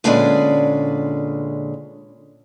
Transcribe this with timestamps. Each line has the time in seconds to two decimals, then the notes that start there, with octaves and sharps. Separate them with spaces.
0.04 A#2 D3 G#3 C#4 B4 D5